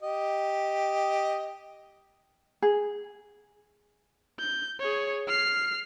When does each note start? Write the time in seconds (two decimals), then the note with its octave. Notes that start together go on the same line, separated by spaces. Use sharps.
0.03 G4 D#5
2.62 G#4
4.39 G6
4.80 G#4 C#5
5.27 F6 C7